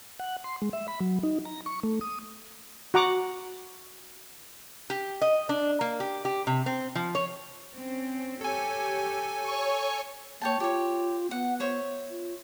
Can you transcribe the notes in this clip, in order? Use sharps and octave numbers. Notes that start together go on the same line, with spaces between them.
F#5
C6
G#3
E5
B5
F#3
D#4
A#5
C#6
A3
D#6
F#4 F#5 A#5 D6
G4
D#5
D4
A#3
G4
G4
C3
C4
F3
C#5
C4 C#4
G4 A4 C#5 G#5
C#5 C#6
A#3 C#5 G5 A5
F4 G4 C#5
B3 F#5
C5 C#5 E5
F4